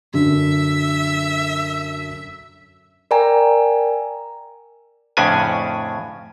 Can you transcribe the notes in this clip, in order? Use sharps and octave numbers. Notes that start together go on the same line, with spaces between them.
F#2 D3 E5
A#4 D5 G5 G#5 A#5
F2 A2 C#3 C#4 D4 G#5